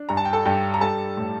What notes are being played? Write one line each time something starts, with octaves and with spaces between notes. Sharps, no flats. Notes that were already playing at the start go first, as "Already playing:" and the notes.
Already playing: D4
G2 A#5
A5
G5
A4 A5
G2 G4 G5
A#5
G3 A4 A5
A2